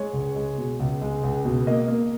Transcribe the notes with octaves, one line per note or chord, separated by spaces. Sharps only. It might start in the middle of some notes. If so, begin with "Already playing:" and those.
Already playing: G#3 C#5
C#2
G#3
B2
C#2
G#3
C#2
B2
A#3 D#5
A#3